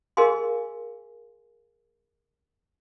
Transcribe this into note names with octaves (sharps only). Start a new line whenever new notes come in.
G#4 A#4 D#5 F5 G#5 C6